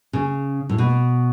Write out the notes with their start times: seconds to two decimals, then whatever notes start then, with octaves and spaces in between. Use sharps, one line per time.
0.13 C#3
0.69 A2
0.78 B2